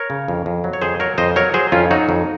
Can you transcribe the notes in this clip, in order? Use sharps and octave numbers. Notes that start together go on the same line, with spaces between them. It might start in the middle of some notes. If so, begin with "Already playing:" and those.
Already playing: A#4 C#5
C#3
F2
F2
F#3
C#5
F2 G#4 C5
F#3 A#4 C#5
F2 C5 D#5
F#3 A#4 C#5
F#3 G#4 C5
F2 C#4 F4
F#3 D#4 F#4
F2